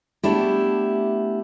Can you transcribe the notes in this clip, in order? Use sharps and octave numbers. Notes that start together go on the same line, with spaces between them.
A3 B3 D4 E4 G4